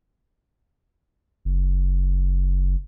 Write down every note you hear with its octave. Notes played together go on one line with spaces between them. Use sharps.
F#1